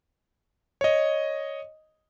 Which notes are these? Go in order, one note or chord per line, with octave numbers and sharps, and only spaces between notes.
C#5 D#5